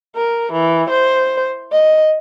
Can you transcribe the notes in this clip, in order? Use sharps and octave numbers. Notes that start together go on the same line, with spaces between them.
A#4
E3
C5
D#5